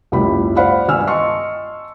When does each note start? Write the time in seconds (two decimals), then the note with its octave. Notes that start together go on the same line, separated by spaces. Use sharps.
0.12 F#1 C#2 G#2 E4 G4 B5
0.56 C5 D5 F5 F#5 B5
0.88 G1 G#5 E6 F6
1.07 D#5 A5 C6 C#6 C#7